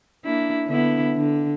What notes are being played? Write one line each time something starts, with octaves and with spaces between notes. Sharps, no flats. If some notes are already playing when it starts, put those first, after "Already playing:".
A#3 D4 E4
D3 B3 E4
D3